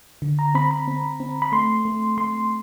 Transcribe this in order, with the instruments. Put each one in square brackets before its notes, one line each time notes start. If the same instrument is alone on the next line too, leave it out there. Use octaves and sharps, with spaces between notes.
[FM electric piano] D3
A#5
C4 B5
B5
C4
C4
B5
A3 C6
A3
A3 C6